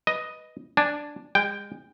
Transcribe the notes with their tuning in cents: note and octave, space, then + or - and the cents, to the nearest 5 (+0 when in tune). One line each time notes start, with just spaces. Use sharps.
B4 +0 D#5 +0
D4 +0 G#5 +0
G#3 -35 G5 +0